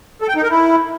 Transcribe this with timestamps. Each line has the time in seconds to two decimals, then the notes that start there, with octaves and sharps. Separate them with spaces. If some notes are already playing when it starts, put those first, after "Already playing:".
0.21 A4
0.29 G5
0.36 D#4
0.43 A#4
0.50 E4